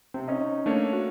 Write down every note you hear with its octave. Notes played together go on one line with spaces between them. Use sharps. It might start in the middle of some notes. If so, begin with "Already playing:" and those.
C3 C4
C#4 D#4
A3 A#3 D4 C#5
F#4